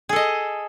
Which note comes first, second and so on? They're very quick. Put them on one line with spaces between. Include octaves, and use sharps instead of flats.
G#4 A4 D#5